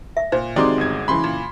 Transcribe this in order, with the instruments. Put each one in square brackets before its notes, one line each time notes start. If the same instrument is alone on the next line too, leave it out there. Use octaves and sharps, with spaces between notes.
[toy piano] E5
[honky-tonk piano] A#2 [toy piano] C5
[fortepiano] C3 D#3 [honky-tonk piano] G#3 D#4 F#4 [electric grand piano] D5 C6 D6
[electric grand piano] G1 G#6
[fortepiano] C#3 E3 [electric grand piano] B5 C6
[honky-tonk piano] A#2